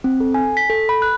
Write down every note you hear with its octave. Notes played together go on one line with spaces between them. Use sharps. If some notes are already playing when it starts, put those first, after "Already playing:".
C4
A4
G#5
B6
A4
B5
F#6